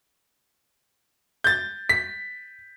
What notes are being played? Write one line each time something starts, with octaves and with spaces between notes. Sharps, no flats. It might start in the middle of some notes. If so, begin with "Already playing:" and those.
G6 A6
B6